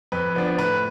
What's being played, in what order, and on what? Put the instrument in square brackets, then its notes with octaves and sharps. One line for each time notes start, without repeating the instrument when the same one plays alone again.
[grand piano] F2 B4
F3 B3 D4
A2 B4